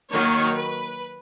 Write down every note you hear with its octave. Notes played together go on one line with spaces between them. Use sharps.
D#3 F#3 A#3 C#5
B4